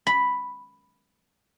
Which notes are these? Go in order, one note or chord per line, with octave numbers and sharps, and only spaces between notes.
B5